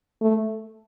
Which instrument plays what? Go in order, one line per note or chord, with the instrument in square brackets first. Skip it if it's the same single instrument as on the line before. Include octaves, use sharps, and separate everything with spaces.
[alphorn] A3